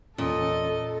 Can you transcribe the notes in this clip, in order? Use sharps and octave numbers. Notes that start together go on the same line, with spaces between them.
E2 A#2 C#4 A4 D#5